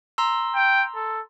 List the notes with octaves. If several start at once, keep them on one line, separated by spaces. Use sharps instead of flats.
A#5 C6 E6
G5
A4